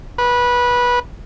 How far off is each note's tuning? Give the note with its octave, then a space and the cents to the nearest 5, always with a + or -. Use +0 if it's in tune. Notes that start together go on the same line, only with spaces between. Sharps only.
B4 -20